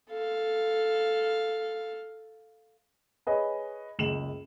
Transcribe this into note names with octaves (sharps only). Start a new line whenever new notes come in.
A4 F5
G#4 B4 C#5 D#5
F#1 C#2 E7 F#7